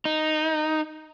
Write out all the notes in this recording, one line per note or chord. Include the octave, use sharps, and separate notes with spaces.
D#4